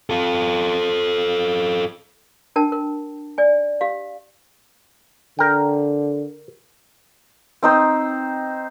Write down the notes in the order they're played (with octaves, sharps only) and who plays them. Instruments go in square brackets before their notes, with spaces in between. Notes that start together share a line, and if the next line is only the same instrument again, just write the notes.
[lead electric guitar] F4 A4
[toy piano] D4 A#4 G5 A5
A#4
D5 G#5
G4 F5
[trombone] D3 [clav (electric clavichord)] A#4 G5
[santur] C4 D#4 C5